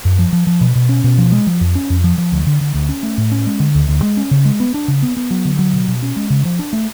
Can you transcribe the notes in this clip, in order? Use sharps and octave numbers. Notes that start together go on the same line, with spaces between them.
F#2
F3
F3
F3
B2
B2
C#4
B2
F3
G#3
F3
F2
C#4
F2
F3
F3
D2
D3
D3
D2
C#4
A3
A2
C#4
G#3
D3
D2
D2
G#3
C#4
C#3
G#3
B3
D4
C#3
B3
B3
F#3
D3
F#3
B2
B2
C#4
G#3
C#3
F3
D4
A3